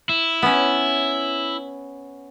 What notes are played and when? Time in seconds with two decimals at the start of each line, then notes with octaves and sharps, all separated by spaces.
0.09 E4
0.42 B3 C#4